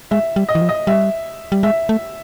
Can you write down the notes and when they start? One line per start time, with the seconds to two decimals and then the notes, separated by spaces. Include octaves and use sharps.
0.11 G#3 E5
0.36 G3
0.49 D#5
0.55 E3
0.62 F3
0.69 D#5
0.87 G3 E5
1.52 G3
1.63 G#3 E5
1.89 A3